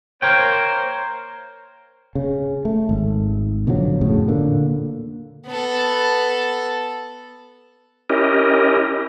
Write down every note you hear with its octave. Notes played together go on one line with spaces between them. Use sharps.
A#3 A#4 C5 C#5 G5
C#3
A3
G#1
B2 D3 F3 F#3
F2 A2 C#3
A#2 D3 A#3
B3 A4
C#4 E4 G4 A#4 D#5